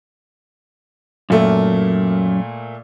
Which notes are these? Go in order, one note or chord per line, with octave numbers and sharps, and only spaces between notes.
F#2 A#2 A3 A#3